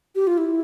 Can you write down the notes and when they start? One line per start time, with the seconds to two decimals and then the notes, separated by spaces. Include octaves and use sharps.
0.15 G4
0.27 F4
0.38 E4